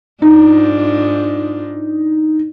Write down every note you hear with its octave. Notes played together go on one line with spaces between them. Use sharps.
G#2 D4 D#4 F4